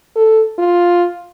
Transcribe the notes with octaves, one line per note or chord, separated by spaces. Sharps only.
A4
F4